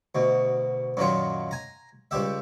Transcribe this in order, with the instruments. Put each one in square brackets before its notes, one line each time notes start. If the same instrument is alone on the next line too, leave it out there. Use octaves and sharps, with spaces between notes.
[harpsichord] D2 B2
F#2 A#2 D#3 F#3 F4
G#5 A#5
C#2 G3 G4 E5